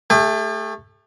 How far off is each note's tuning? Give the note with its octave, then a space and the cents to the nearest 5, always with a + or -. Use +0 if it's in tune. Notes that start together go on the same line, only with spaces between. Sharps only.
A3 +0 G4 +45